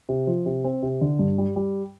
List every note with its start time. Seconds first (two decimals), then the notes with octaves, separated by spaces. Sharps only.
0.09 C3
0.27 F3
0.46 C3
0.64 C4
0.82 C3
1.01 D3
1.19 G2
1.38 G3
1.56 G3